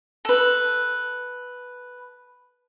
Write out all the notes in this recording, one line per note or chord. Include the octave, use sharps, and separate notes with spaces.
A4 B4